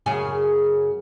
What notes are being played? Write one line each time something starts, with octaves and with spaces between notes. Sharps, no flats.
F#2 C#3 G#4